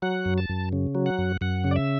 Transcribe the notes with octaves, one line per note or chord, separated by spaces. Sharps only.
F#3 F#5
F#2
A5
F#2
C#3
F#3
F#5
F#2
F#2 F#5
C#3
D5
E5